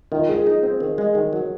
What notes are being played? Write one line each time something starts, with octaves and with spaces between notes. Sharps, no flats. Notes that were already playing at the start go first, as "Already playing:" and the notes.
D#3 F4
G#3 G#4
D#4
C4
D#3
G#3
D#3
F#3